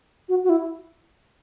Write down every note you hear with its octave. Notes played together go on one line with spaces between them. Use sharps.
F#4
F#4
E4